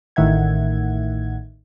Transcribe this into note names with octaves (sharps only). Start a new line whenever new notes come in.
A1 A2 D#3 E5 F#5 G#6